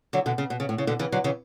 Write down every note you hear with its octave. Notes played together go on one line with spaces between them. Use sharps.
D3 F#3
B2 D3
C#3
B2
C#3
A2
C#3
B2 D3
C#3 E3
D3 F#3
C#3 E3